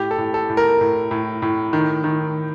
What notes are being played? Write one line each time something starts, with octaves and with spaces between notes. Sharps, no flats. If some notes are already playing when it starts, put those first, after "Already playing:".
Already playing: A2 G4
A4
A2
A4
A2
A#4
A2
A2
A2
D#3
D#3